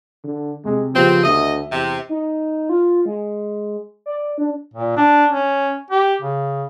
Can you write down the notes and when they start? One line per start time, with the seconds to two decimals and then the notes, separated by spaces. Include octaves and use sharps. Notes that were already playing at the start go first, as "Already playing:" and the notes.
0.24 D3
0.65 C3 G#3
0.94 C#3 F3 B3 C4 G4
1.24 D2 D#5 E5
1.71 E2 C3
2.09 D#4
2.69 F4
3.06 G#3
4.06 D5
4.38 D4
4.74 A#2
4.97 D4
5.32 C#4
5.90 G4
6.22 C#3